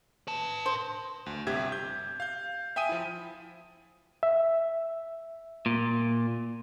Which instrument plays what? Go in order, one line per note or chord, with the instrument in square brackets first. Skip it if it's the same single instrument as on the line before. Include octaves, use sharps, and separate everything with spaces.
[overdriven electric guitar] B4 A5
[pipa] C5
[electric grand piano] D2
G1 C3 G4 E5 G#6
G6
F5 G6
E5 G5 G#5 D#6 D#7
F3 E4
[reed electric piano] E5
[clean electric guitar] A#2